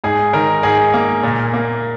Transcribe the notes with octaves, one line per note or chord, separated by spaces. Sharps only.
G#2 G#4
D#3 A#4
G#2 G#4
A#3
A#2
A#3